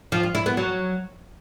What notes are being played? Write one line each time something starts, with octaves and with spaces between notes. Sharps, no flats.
F3
F4
E4
B3
F#3